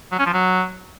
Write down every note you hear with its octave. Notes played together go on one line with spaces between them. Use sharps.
F#3
C#4
F3
F#3